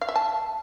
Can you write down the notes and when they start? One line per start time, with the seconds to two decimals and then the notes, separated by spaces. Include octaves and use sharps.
0.01 F5
0.09 E5
0.16 A5